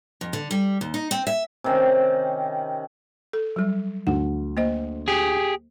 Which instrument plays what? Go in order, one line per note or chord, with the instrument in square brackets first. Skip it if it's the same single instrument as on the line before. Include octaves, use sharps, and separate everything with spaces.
[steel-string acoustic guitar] F2
D3
G3
D#2
D#4
C4
E5
[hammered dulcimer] C3 D#3 C#4
[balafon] A4
F#3 G3
[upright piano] D2 [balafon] F#5
[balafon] A#3 C5 D#5
[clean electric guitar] G4 G#4